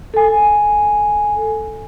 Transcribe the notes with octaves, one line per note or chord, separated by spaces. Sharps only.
A4 G#5